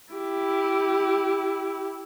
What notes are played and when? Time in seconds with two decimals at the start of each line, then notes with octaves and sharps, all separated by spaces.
0.13 E4 G4